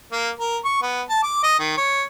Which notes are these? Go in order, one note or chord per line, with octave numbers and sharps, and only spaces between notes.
A#3
A#4
C#6
B3
A5
D6
D#5
D#3
C#5